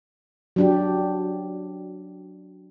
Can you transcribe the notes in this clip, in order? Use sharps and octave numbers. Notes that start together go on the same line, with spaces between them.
F#3 D4 G4